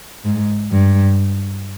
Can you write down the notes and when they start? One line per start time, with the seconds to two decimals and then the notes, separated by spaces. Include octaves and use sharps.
0.25 G#2
0.71 G2